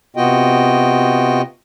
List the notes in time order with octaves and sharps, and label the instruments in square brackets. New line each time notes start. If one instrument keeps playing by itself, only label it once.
[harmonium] C3 B3 F4 F#4 D#5 G5